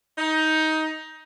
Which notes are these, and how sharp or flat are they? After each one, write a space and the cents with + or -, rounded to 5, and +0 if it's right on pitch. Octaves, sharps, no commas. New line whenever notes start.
D#4 +15